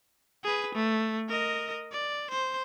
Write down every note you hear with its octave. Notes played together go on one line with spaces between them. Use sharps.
G#4 B4
A3
A#4 D#5
D5
C5